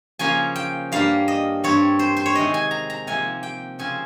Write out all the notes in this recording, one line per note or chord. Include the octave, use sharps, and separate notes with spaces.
C#3 F3 A#3 C#4 G#5
G5
G2 G3 A#3 F5
D#5
G2 G3 C4 C#5
C5
C5
C#5
C3 D#3 G#3 D#5
G#5
A#5
A#5
C3 F3 A#3 G#5
G5
C#3 F3 C4 G#5